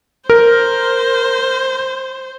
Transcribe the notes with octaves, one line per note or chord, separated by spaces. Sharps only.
A#4 C5